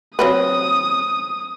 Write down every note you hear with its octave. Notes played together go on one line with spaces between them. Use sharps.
F#3 C4 B4 D#6